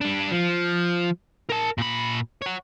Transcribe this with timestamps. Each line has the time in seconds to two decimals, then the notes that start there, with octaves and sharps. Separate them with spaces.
0.01 G3 D4
0.31 F3
1.50 A#4 A5
1.78 A#2 B5
2.42 C#5 F#5